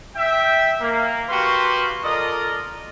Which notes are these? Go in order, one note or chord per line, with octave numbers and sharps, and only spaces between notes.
E5 G5
A#3
A#3 F#4 G4 B4 F5 C6
F4 A4 A#4 D5 D#5